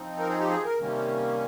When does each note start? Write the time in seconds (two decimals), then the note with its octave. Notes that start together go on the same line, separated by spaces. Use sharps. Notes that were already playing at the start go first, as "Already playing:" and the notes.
Already playing: F3 C4 D#4
0.19 A#4
0.29 G#4
0.40 G4
0.49 G#4
0.65 A#4
0.80 C3 D#3 G3 A#3 C#4